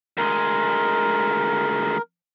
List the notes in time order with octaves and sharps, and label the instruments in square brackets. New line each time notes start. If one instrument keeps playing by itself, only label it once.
[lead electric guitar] D2 G#3 [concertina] A#4